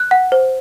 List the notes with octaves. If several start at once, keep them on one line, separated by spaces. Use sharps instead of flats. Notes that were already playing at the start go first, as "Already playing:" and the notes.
Already playing: F#6
F#5
C5